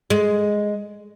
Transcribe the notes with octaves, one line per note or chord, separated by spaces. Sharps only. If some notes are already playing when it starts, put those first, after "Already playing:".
G#3